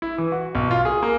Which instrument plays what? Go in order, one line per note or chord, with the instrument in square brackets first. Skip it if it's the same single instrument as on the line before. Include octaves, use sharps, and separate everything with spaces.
[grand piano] E4
E3
F#4
B1
F4
G#4
A#3